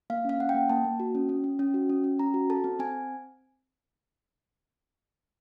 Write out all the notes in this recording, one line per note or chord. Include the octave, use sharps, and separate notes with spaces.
A#3 F5
C#4 F5
C#4 F#5
G5
A#3
A#3 A5
A#3
F#4
C#4
C#4
C#4
C#4
F#4
C#4
C#4
C#4 A#5
F#4
A4 A5
C4
C4 G#5